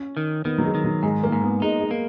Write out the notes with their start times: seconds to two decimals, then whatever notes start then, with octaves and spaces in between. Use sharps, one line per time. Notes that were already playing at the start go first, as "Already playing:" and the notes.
Already playing: C#4
0.17 D#3
0.45 D#3 B3
0.58 F#3
0.65 G#3
0.75 D#3
0.84 F#3
1.03 G#2 G#3
1.23 A#3
1.32 G#2
1.42 B3
1.62 G#3 D#4
1.81 G#3
1.91 A#3